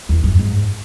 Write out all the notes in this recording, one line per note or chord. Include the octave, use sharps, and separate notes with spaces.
E2
F#2
G#2